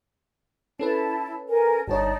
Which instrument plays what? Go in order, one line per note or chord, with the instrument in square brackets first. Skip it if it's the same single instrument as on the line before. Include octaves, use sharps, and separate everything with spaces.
[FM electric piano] C#4 A4 B4 [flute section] E4 A5
[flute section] A#4 G#5
[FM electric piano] G1 G2 C#5 [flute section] D#4 D5 A5